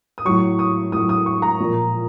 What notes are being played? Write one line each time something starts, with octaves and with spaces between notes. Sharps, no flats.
D#6
A2 F#3 C#6
D#6
A2 F#3 D#6
D#6
C#6
A#5
A#2 F3